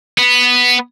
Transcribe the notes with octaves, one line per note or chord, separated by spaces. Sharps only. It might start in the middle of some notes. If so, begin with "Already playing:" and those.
B3